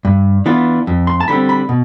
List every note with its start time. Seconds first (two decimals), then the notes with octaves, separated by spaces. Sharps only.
0.05 G2
0.46 E3 B3 D4 F4
0.87 F2
1.07 C6
1.21 A5
1.28 D3 G3 C4 B5
1.49 B5
1.69 B2